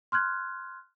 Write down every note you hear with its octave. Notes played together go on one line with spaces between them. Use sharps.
C6 F6 F#6 G#6